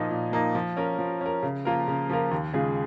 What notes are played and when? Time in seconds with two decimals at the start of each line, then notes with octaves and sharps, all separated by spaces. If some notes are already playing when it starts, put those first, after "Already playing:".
Already playing: A#2 F3 A#3 D#4
0.11 A#2
0.32 F3 A#3 D#4
0.55 F3
0.77 C#4 A#4
0.99 F3
1.21 C#4 A#4
1.43 C#3
1.65 F3 A#3 F4 A#4
1.88 C#3
2.09 F3 A#3 F4 A#4
2.31 D#2
2.54 C#3 G#3 F4 G#4